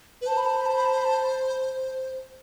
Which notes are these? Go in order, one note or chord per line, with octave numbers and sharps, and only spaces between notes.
B4
C5 A5
B5
A5
B5
A5
B5
A5
B5
A5